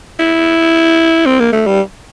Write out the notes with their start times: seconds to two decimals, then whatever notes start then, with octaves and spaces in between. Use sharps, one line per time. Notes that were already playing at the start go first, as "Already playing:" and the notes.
0.20 E4
1.26 C4
1.40 A#3
1.52 A3
1.67 G3